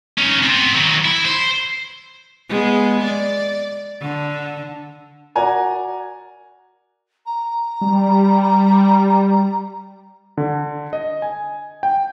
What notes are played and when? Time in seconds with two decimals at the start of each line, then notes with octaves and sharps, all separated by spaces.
0.18 C#4 D#4
0.43 B3 C4
0.74 D#3 F#3
1.05 E4
1.25 C5
2.49 G#3 B3
3.04 D5
4.01 D3
5.35 F#4 A#4 D5 F#5 G#5 A#5
7.26 A#5
7.81 G3
10.37 D3
10.93 D#5
11.22 G#5
11.83 G5